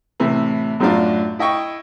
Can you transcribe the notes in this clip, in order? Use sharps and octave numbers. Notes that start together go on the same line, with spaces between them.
A2 C3 E3
F#2 A2 F#3 D4 F4
E4 D#5 G5 C#6